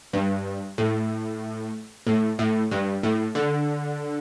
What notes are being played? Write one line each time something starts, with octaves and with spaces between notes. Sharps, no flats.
G2
A2
A2
A2
G2
A2
D3